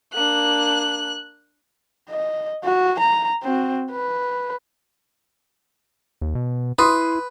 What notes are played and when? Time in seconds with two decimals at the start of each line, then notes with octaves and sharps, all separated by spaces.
0.14 A#3 D4 F#6
2.10 D#5
2.64 F#4
2.99 A#5
3.43 C4 F#4
3.91 B4
6.21 D#2
6.35 B2
6.79 E4 B4 C6 D#6